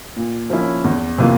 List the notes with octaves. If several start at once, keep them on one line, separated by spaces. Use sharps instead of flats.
A#2
F3 A#3 C#4 E4
E2
C3 E3 A#3 F4